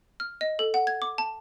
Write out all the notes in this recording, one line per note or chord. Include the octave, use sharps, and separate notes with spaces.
F6
D#5
A4
F#5
G#6
D6
A5